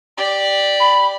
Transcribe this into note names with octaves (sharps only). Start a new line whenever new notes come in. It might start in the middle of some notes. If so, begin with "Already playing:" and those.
G4 D5
B5